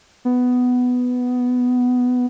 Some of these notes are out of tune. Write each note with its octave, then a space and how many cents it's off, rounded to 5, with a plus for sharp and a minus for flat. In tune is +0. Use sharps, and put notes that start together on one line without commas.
B3 +10